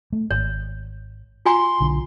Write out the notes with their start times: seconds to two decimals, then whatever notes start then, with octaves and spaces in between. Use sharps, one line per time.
0.13 A3
0.31 G#1 C#5
1.46 F4 G#5 A#5 C6
1.80 B1 D3